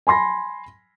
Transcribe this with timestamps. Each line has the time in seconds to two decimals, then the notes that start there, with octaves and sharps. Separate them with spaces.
0.07 G#5 B5 C6 A#6